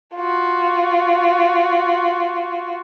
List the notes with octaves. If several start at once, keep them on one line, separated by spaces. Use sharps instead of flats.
F4 F#4